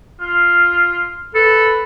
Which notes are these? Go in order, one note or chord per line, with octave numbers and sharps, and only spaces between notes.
F4
A4 B4